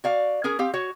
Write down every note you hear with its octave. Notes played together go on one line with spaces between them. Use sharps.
F#4 D5 F5
C#4 G#4 A#4
C4 G4 F5
F#4 C#5